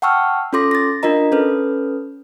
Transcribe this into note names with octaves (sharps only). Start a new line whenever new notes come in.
F#5 G5 A5 C#6 E6 F6
C#4 F4 A4 C6 D6 A#6
A6 A#6
D4 F4 A#4 D#5 A#5
C#4 A4 B4